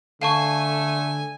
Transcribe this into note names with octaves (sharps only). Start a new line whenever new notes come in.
D3 A3 F5 G#5 A5 C#6